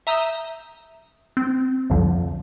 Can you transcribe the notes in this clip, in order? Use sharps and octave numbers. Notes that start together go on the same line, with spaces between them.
E5 A#5 D#6 E6 G6
C4
C2 F2 D3 F3